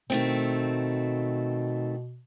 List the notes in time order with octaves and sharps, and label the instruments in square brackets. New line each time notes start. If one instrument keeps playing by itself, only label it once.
[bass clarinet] B2 [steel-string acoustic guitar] D#3 A3 C4